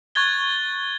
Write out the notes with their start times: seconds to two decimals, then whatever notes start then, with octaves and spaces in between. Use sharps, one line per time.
0.15 C#6 F#6 G#6 A6 G7